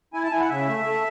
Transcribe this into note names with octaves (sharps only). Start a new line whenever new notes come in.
E4 G#5
A5
E4 G#5
F#5
C#3 E5
A3
A3